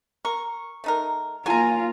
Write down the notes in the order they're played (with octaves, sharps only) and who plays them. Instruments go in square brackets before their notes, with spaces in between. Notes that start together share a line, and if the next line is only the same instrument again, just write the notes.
[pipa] A#4 [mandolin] C#6
[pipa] A3 D#4 A#4
[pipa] F#3 [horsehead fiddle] A#3 F4 [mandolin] G#5 A#5